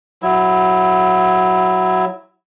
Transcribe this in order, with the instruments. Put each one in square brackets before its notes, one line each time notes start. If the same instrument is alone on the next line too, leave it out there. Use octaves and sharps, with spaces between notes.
[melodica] F#3 E4